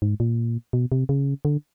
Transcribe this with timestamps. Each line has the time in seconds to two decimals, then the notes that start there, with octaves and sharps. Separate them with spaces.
0.02 G#2
0.20 A#2
0.73 B2
0.92 C3
1.09 C#3
1.45 D3